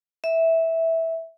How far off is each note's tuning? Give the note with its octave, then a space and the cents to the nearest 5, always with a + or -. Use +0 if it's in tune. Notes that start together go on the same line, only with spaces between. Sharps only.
E5 -10